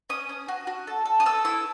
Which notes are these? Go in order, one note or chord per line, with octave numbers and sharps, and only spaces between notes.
C#4 D#6
C#4
F#4
F#4
A4
A4
D#6
A4 E6
E4 E6